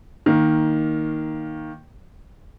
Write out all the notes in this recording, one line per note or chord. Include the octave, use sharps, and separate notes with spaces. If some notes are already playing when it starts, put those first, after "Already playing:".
D#3 A#3